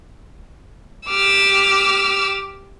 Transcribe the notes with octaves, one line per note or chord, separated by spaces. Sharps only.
G4 D6 E6 F6